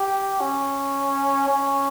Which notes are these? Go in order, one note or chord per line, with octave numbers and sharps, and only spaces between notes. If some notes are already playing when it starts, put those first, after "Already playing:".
Already playing: G4
C#4
C#4